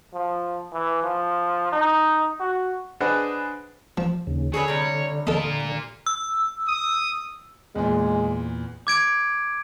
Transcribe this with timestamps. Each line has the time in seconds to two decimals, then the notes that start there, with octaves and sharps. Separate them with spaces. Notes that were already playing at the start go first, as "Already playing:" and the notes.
0.14 F3
0.72 E3
1.04 F3
1.72 D#4
2.40 F#4
3.00 D4 G#4 B4 C5 D#5 F#5
3.98 F3
4.27 D#2 C#3
4.54 D3 G#4 A4 B4 C#5
4.68 C3 G3
5.27 F4 A4 A#4 D#5
6.06 E6
6.67 D#6
7.75 E2 A#2 G#3
8.87 D6 G#6 D7